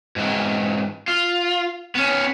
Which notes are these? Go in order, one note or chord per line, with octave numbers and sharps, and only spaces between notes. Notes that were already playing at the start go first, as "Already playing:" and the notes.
G#2 E3
F4
B3 C#4